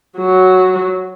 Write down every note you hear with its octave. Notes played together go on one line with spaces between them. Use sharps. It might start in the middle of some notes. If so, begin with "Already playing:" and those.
F#3 F#4